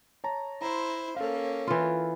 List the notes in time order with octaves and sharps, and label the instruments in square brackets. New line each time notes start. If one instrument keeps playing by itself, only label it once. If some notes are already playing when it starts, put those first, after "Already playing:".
[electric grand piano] C#5 A5 A#5
[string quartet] E4 C5 [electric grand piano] A#5 C6
[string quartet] A#3 C#4 [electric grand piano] A4 F5
[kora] E3 F4